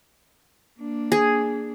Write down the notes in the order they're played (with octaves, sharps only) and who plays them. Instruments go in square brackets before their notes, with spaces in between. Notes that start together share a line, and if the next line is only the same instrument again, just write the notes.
[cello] A#3 D4
[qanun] G#4